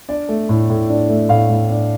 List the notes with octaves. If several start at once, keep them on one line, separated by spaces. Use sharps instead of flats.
D4 D5
A3
A2
A2
D4
A3
A2 F5
A2
D4